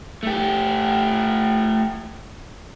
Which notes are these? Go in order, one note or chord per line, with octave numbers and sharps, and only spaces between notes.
A3 G4